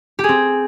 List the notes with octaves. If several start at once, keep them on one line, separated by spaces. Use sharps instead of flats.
G4
G#4
C4